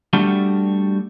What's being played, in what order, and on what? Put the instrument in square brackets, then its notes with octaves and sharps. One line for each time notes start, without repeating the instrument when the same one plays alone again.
[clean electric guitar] G3 A3 D4 F#4 G4 A4